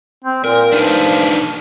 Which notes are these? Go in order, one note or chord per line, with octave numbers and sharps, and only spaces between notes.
C4
A#2 A#4
F3 D4 D#4 B4